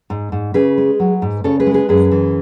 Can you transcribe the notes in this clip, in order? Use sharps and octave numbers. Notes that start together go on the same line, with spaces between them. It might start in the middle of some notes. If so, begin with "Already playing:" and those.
G#2
G#2
C#3 G#4 B4
G#3
F#3
G#2
C#3 A4 C#5
G#4 B4
G#3
G#4 B4
F#2 G#4 B4
E3